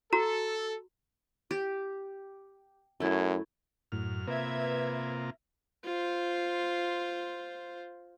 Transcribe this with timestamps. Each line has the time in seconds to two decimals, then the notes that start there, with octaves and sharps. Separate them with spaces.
0.13 F#4 A4 A#5
1.51 G4
3.00 F#2 A3 E4
3.92 F#2 A2 F6
4.27 C3 A#3 F4 B4 E5 G#6
5.84 F4 C5